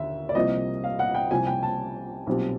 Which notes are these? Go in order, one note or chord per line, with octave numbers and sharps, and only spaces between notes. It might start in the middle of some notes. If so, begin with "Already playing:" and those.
Already playing: D#2 D3 E5
D5
C2 C3 F3 A#3 D#5
F5
F#5
G5
C2 C3 F3 G#5
G5
A5
B1 A#2 G3 C4